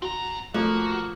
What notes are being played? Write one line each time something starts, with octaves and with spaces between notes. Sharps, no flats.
C4 F#4 A#5
F3 A3 A#3 F#4